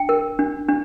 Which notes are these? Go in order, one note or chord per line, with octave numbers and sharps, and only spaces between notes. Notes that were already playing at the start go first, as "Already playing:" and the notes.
Already playing: D4 G5
A#4
D4
D4